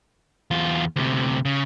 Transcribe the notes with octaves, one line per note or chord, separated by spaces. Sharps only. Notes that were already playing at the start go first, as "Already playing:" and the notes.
E2 F4
D2 C3
C#3